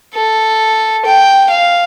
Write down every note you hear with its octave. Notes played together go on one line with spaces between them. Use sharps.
A4
G5
F5